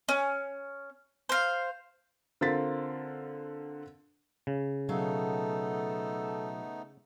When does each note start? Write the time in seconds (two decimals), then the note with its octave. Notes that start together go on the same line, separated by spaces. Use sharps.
0.09 C#4
1.29 C5 F5
2.41 D3 C4 F4 A#4 A6 B6
4.47 C#3
4.89 B2 F#3 A3 B3 D#4 A4 F5